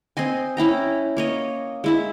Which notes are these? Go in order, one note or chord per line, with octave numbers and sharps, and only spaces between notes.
C4 C5 D#5 G#5
C#4 E4 G5 A#5
A#3 C#5 D#5
G#3 E4 E5